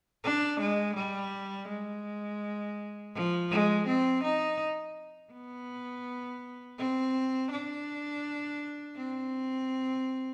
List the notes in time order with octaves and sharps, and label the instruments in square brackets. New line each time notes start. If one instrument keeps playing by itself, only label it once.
[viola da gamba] D4
G#3
G3
G#3
F3
G#3
C4
D#4
B3
C4
D4
C4